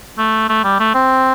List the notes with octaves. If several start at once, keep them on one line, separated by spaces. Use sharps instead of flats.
A3
A3
G3
A3
C4